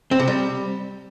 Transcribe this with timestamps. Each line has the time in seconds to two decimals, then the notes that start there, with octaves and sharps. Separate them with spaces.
0.11 C4
0.19 C3
0.28 G3